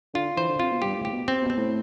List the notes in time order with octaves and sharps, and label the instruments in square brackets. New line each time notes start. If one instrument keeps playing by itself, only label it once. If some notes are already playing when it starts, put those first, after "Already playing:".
[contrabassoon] D3 [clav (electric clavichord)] F4
[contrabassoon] E3 [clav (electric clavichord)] C5
[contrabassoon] D3
[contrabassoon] C3 [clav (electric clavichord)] F4
[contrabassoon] B2
[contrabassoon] G2 [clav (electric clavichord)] G4
[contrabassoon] A2
[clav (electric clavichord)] G4
[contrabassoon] B2
[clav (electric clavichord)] C4
[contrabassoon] B2
[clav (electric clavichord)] C4
[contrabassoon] A2